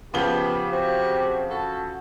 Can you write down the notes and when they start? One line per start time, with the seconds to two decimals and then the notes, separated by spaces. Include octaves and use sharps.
0.14 C#3 F3 B3 G4 G7
0.73 C4 F#4
1.51 F#4 A4